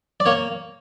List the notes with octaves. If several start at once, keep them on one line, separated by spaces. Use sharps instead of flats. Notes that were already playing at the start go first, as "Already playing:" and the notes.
D5
A#3 C#5